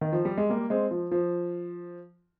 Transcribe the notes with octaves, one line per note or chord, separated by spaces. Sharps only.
D#3
F3
G3
G#3
G3 A#3
G#3 C4
F3
F3